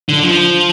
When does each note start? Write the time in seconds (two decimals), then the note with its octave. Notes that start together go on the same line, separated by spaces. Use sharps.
0.09 D3
0.24 F3